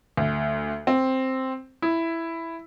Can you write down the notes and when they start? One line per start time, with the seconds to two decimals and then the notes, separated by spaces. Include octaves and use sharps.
0.17 D2
0.87 C4
1.82 E4